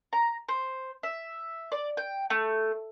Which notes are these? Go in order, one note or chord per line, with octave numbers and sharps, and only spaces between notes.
A#5
C5
E5
D5
G5
A3